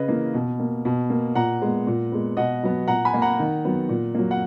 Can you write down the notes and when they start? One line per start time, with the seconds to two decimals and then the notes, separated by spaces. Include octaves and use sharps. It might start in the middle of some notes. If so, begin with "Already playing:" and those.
Already playing: C#3 B4 D#5
0.08 E3 A#3
0.34 B2
0.60 A#3
0.85 B2
1.10 A#3
1.35 A#2 F#5 A#5
1.62 G#3 B3
1.87 A#2
2.12 G#3 B3
2.37 B2 D#5 F#5
2.63 F#3 B3
2.88 A#2 F#5 A#5
3.05 G#5 B5
3.14 A#3
3.22 F#5 A#5
3.39 D#3
3.65 F#3 B3
3.89 A#2
4.15 F#3 A#3
4.31 F#5